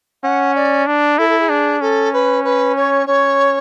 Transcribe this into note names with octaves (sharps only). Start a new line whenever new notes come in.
C#4 F#5
D5
D4
E4 A4
A4
G#4
D4
C#4 A4
B4
B4
C#5
C#4 C#5